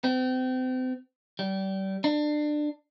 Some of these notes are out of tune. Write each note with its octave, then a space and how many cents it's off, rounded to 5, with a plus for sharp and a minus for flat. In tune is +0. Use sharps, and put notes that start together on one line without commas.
C4 -35
G3 -30
D4 +25